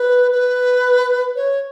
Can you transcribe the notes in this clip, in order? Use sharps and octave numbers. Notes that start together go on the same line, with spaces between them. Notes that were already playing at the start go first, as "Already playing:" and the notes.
Already playing: B4
B4
C#5